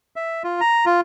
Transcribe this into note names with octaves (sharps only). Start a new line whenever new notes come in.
E5
F4
A#5
F4